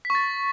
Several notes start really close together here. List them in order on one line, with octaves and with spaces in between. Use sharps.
B6 C#6 A6